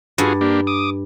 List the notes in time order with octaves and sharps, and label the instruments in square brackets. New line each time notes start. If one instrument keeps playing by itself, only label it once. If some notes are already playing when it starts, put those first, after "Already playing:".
[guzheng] G2 [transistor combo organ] F4 F#4 G#4
[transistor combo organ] A#3 D4 G4
D6 D#6